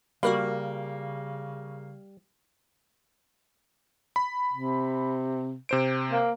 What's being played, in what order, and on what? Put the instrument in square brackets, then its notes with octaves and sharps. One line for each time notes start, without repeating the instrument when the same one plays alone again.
[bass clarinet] C#3 [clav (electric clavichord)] G3 [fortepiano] A#3 [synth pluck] F#4 A#4 B5
[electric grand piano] B5
[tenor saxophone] C3
[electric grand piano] C3 C5 D7
[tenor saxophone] A#3